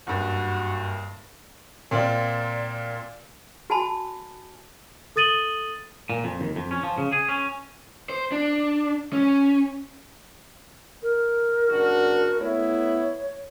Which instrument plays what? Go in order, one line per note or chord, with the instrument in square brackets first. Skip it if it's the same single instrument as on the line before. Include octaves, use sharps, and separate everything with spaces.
[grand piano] F#1 G2 [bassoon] F#4
[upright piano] A#2 C4 F4 D5
[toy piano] F#4 G#5 A5 B5
[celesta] A4 D#6 A6 D#7 F#7 G7
[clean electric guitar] A#2
F2
D#2
F2
C#4
F3
C#3
G#4
C#4
[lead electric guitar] C5
D4
C#4
[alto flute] A#4
[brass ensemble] F#1 D4 F#4
[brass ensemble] A3 B3 E4 [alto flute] C#5